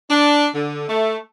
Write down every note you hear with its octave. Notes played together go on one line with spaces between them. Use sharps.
D4
D3
A3